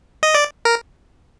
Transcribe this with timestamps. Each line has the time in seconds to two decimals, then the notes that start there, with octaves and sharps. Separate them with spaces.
0.23 D#5
0.34 D5
0.65 A#4